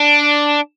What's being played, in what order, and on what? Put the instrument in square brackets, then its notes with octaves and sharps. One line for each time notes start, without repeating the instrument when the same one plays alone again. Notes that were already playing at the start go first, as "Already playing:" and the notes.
Already playing: [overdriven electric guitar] D4